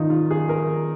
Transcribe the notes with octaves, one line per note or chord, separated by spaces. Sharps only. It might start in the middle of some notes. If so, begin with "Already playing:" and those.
Already playing: D#3 C#4 D#4 F4
F4
G#4
A#4